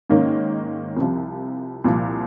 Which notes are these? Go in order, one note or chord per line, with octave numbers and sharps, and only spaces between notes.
G#2 D#3 A#3 C#4
C2 C3 F3
C2 A#2 F3